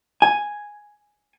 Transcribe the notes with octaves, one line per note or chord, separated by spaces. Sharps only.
G#5